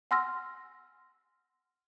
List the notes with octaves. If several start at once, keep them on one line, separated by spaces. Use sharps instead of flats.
F#5 G#5 C6 E6 F6 A#6